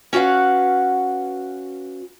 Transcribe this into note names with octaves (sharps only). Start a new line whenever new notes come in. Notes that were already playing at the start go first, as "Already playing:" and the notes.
C#4 F#4 B4 F5 F#5